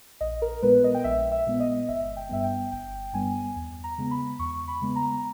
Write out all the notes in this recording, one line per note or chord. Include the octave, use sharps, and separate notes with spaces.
A#1 D#5
A#4
A#2 G#3 B3 B4
D#5
G5
A#1 E5
E5
A#2 G#3 B3
D#5
G1 E5
G5
G2 G3 B3 E5
G5
G1 G5
G2 G3 B3 G#5
E2
A#5
C#3 G#3 B3
B5
E2 C#6
B5
C#3 G#3 B3
A#5